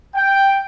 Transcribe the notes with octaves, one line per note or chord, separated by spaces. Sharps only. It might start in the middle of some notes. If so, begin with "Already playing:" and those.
G5